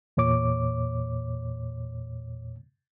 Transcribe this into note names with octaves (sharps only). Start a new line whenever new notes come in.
E2 A#2 C#5 D6